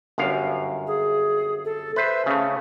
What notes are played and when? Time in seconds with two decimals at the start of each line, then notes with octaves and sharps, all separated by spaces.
0.18 G1 F#2 F5
0.87 G#4
1.65 A4
1.96 B4 C5 E5
2.26 C#3 A3 C#4